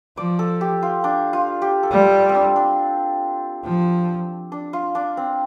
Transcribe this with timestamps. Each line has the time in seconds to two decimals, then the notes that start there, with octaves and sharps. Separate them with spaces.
0.17 F3 D5
0.39 A4
0.61 G4
0.82 F4
1.04 D4
1.33 F4
1.62 G4
1.83 A4
1.91 G3 C5
2.29 C4
2.35 D4
2.56 D4
3.64 F3
4.52 D4
4.73 F4
4.95 D4
5.17 C4